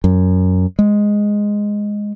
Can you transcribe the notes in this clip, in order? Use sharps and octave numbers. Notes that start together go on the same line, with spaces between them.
F#2
G#3